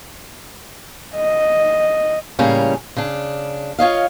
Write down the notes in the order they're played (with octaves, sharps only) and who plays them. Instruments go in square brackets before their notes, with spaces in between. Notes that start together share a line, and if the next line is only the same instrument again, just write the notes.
[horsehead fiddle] D#5
[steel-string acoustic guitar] A2 C#3 G3 A#3 C#4
C#3 D4
F4 C#5 D#5 F5